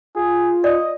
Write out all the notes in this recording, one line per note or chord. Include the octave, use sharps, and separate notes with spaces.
F4 G#4
D5 D#5